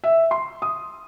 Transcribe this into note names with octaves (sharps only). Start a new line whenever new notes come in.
E5
C6
D#6